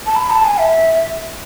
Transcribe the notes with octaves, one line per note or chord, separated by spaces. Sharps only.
A5
B5
A5
G#5
E5